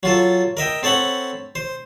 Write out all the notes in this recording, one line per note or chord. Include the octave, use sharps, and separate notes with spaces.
F#3 F4 A4
A#4 D#5 E5 G5
C4 A4 C#5 F#5 B5
C5